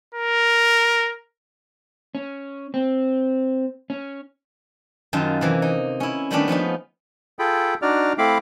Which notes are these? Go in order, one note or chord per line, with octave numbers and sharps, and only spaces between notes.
A#4
C#4
C4
C#4
F#2 D#3 F4 A5
C3 E3 A#3
D#4
C#4 E4
D#3 G3 A3 B3 C#4 D4
F3 B3 C#4 D#4
F4 G#4 A4 G5 B5
D4 D#4 F#4 D5 F6
A3 C4 E4 F5 B5 D6